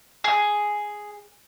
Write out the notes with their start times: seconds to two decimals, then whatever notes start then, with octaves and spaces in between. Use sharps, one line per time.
0.24 G#4